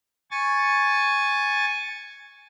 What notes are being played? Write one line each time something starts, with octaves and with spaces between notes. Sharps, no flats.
G#5 C#6 A6